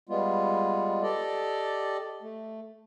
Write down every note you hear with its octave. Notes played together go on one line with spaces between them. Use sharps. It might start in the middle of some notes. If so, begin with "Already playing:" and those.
G3 G#3 B3 F4
G4 A4 D5 D#5
A3